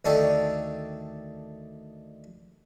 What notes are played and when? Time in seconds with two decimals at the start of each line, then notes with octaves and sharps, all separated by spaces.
0.05 D2 D#3 D4 A4 C#5 G5